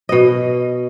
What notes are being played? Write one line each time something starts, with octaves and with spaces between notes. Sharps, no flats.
B2 D#5